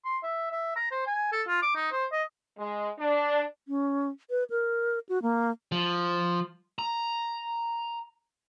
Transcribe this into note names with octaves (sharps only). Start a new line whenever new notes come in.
C6
E5
E5
A#5
C5
G#5
A4
F4
D6
D#4
C5
D#5
G#3
D4
C#4
B4
A#4
F#4
A#3
F3
A#5